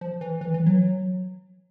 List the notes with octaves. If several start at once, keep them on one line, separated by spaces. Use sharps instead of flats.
F3
E3
E3
E3
F#3